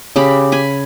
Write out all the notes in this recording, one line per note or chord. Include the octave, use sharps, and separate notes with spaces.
C#3 G4 B5
G#5 B5